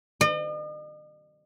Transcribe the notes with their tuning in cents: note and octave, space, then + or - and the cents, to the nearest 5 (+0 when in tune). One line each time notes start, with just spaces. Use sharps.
D#5 -45